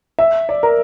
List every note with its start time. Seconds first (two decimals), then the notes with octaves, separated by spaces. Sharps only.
0.19 E5
0.49 D5
0.63 A#4